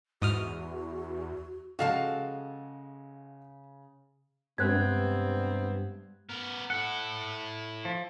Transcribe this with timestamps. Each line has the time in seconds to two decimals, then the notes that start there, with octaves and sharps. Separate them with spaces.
0.22 E2 G#2 F#4 D#6 F6
1.79 C#3 F3 G#3 F#4 A4 F5 A5
4.58 G2 C3 G#3 B3 C4 F#6 G#6
6.29 B3 A#4
6.70 E4 A4 F#5
7.85 F3